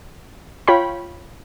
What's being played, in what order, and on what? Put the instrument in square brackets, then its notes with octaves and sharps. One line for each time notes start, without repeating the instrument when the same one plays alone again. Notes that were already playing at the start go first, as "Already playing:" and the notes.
[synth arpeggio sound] F4 C#5 G5 B5